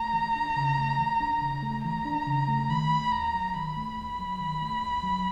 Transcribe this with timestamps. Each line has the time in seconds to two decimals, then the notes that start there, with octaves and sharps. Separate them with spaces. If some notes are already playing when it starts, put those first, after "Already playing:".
Already playing: A3 A#5
0.13 E3
0.36 D4
0.56 C#3
0.78 A3
0.98 E3
1.20 D4
1.42 C#3
1.62 A3
1.84 E3 A#5
2.05 D4
2.27 C#3
2.48 A3
2.70 D#3 B5
2.90 A3
3.11 D#2 A#5
3.33 F#3
3.54 D#3 B5
3.77 A3
3.97 D#2
4.19 F#3
4.40 D#3
4.62 A3
4.82 D#2
5.03 F#3